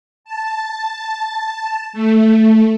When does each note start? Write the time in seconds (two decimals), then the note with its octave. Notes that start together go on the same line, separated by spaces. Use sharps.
0.25 A5
1.93 A3